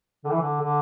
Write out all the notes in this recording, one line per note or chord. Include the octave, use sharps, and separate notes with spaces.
D3
E3
D3
D3